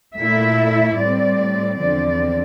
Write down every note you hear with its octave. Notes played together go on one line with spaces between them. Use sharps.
A#2 A3 E4 E5
A2 G3 C4 D5
E2 D3 F3 C4 D5